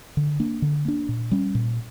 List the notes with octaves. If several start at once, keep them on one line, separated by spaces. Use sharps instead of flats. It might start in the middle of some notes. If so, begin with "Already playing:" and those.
D3
A#3 D4
D3
A#3 D4
A#2
G3 C#4
A#2